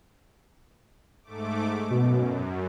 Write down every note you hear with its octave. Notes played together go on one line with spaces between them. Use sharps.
G#2 A3 D6
F#2 B2